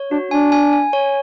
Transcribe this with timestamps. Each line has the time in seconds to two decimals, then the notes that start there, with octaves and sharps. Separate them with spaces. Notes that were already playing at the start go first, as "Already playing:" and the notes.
Already playing: C#5
0.11 D4 F#4
0.31 D4 G#5
0.52 G#5
0.73 G#5
0.93 C#5